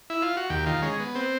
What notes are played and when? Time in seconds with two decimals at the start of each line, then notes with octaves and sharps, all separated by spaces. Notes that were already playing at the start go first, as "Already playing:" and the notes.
0.10 E4
0.22 F4
0.37 F#4
0.50 D#2 G4
0.66 D#3 F4
0.82 G#3 C#4
0.99 B3
1.15 C4